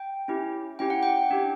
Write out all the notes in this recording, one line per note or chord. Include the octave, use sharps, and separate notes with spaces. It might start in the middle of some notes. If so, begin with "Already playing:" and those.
Already playing: G5
C#4 E4 G4
C#4 E4 G4 G5
F#5
G5
D4 G4